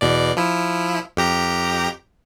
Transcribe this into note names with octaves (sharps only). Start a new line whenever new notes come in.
E2 B2 D5
F3 E4
F2 G4 A#5